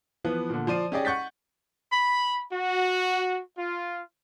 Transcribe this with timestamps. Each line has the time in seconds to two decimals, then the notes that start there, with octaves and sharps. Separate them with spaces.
0.24 E3 F3 B3
0.50 A#2 D3
0.67 F3 C5 D5 D#7
0.92 C#4 D#4 G4 G#4 D5 D#5
1.05 F#5 C#6 G6 A6 B6
1.91 B5
2.51 F#4
3.57 F4